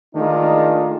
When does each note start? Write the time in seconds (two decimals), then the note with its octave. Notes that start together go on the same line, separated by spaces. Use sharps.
0.15 D#3 G#3 A3 D4 D#4 F4